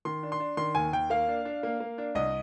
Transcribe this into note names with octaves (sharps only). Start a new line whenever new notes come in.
D#3 C6
D4
C6
D4
D#3 C6
D#2 G#5
D#2 G5
A#3 F5
D4
D4
A#3
A#3
D4
C2 D#5